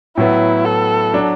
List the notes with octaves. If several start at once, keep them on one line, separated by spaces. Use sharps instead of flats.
A2 F#3 B3 E4
A4
F#3 D4